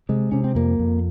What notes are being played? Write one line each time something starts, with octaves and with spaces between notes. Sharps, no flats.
C3 G#3
C3 C#4
C4
F2 A#3
F2